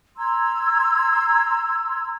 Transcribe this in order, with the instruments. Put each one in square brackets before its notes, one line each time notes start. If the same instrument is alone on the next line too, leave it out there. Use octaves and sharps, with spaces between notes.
[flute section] A#5 C6 E6 G#6